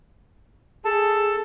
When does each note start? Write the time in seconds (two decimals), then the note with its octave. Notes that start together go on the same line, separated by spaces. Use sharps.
0.85 G#4 A4 A5